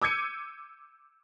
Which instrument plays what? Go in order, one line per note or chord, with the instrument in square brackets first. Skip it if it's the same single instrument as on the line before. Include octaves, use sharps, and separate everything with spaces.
[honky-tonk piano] D6 E6 G6 G#6 C#7 D#7